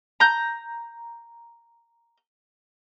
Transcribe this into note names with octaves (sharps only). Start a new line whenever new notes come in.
A#5 G6